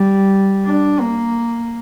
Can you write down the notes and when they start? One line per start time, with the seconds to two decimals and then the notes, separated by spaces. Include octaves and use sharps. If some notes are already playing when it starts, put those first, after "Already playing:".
Already playing: G3
0.66 D4
1.00 A#3